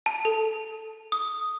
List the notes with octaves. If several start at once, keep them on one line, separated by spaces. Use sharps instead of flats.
A5
A4
D#6